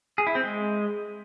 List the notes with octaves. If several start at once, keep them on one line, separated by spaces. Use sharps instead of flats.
G#4
E4
C4
G#3